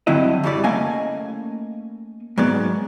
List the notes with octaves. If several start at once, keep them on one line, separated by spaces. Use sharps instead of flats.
G2 D3 F#3 C4 E4 D#5
F#2 C#3 G3 E4 D5
A3 A#3 C#4 D#5 F5 G#5
G#2 F#3 B3 D5